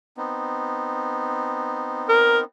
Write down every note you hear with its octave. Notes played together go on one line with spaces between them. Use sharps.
B3 C4 D#4
A#4